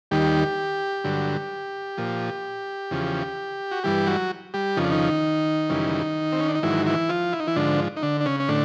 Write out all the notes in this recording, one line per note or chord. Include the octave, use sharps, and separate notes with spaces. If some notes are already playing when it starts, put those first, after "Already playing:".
D#2 D#3 G3 G4
G2 D3 F#3
A#2 F3
E2 C#3 F3
F#4
G2 E3 G3 G4
F#3 F#4
G3 G4
F2 C#3 F3 D#4
D4
D#3 D#4
F#2 C#3 E3 G3
C4
C#4
D4
D#4
G#2 D#3 E3 F#3 E4
E3 E4
F3 F4
E4
D#4
E3 E4
G#2 D3 F3 D4
D#4
D3 D4
D4
C#3 C#4
C#4
A2 D3 D4